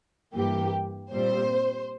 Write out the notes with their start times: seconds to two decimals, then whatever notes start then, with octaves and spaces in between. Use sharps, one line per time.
0.34 G2 E3 A#3 G4
1.11 A#2 G3 C4 C5